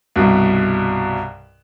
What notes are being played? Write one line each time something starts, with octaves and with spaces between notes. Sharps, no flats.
C2 G2 B2